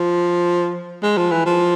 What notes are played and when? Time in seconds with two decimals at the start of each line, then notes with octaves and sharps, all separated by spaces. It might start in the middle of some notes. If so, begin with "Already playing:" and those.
Already playing: F3
1.03 G#3
1.18 F3
1.31 E3
1.46 F3